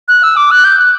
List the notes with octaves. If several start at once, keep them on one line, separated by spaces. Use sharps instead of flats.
F#6
E6
D6
F#6
G6
F#6